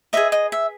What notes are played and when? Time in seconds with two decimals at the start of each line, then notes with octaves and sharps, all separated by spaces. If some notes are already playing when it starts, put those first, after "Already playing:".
0.13 G#4 B4 D#5 E5
0.32 D#5
0.52 E5